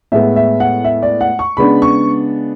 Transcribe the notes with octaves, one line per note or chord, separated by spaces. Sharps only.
A2 G#3 B3 E5
E5
F#5
E5
D5
F#5
C#6
C#3 G#3 B3 D4 B5
C#6